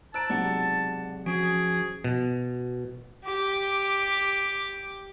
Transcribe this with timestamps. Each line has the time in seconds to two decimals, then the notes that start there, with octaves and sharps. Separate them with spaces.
0.14 C5 A5 A#5 E6 F#6 D7
0.30 B1 C3 G#3 D5 F#5
1.26 F3 C#4 F#4 G#4 D7
2.04 B2
3.24 G4 D6